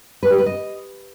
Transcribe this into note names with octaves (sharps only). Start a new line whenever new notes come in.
B4
G4
B4
D#5